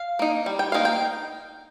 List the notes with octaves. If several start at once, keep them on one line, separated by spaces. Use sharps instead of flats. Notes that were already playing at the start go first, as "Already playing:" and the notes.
Already playing: F5
A#3 D#4
G3
G5
A#3 D#4 F5
G5